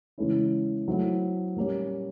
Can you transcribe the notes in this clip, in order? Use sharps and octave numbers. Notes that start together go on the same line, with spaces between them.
C#3 E3 G#3 C#4 E4
F#3 A3 C4 E4
A#2 G3 A#3 C#4